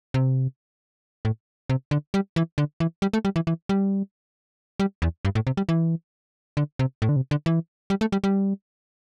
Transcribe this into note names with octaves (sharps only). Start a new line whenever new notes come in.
C3
A2
C3
D3
G3
E3
D3
E3
G3
A3
G3
E3
E3
G3
G3
E2
G2
A2
C3
G3
E3
D3
C3
A2
D3
C3
D3
E3
G3
A3
G3
G3